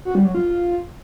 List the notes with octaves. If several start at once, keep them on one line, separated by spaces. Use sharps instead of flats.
F#4
G3
F#3
F4